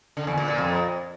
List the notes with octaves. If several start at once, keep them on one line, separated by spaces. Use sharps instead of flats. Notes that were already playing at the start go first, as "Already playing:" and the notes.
D3
E2
A#2
A#2
F2